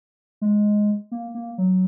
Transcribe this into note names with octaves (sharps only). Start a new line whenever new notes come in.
G#3
A#3
A#3
F#3